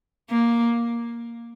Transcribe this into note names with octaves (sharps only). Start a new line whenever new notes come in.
A#3